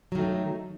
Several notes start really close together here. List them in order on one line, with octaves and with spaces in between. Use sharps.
F#3 D#3 A3 D#4